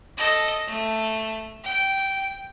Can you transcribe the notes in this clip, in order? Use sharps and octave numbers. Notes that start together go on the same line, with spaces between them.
A4 D#5
A3
G5